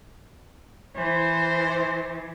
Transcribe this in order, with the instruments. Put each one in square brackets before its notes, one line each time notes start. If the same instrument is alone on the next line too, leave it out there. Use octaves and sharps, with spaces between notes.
[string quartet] E3 [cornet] C5